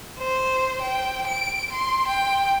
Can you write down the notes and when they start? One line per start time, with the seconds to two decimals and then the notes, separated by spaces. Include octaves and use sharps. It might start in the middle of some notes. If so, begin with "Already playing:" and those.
0.18 C5
0.81 G5
1.27 D7
1.72 C6
2.07 G5